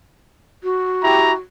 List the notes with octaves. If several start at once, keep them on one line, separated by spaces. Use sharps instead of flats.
F#4
E4 G4 A#5